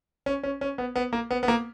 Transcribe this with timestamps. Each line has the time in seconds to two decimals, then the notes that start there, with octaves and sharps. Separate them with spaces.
0.26 C#4
0.43 C#4
0.61 C#4
0.78 B3
0.96 B3
1.13 A#3
1.31 B3
1.43 B3
1.48 A#3